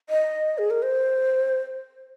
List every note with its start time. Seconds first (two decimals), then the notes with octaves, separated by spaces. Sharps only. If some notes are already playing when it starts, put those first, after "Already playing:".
0.10 D#5
0.58 G#4
0.70 A#4
0.83 C5